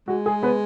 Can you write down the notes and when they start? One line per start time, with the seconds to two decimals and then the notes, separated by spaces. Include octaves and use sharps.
0.08 G#3 F#4
0.26 G#4
0.43 B3 B4